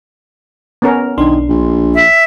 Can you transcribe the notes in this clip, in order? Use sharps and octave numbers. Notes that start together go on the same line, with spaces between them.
B3 C#4 A#4
B1 D#3 D4 C6
A#1
E5